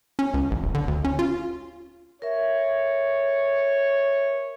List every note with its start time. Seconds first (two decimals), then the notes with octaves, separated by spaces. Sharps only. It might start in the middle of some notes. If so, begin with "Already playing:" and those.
0.19 C#4
0.34 C#2
0.51 A1
0.62 D1
0.74 D3
0.88 D2
1.04 C#4
1.19 F4
2.22 A#4 C#5 E5